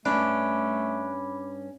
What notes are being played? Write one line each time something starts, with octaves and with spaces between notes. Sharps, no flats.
G2 A3 C#4 D4 B5 D6